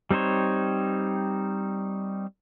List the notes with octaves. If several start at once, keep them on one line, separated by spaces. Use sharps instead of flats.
G3 C4 D#4 C5 C#5